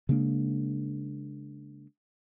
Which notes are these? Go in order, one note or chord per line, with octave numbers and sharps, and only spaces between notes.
C#3 G#3 A#3 D4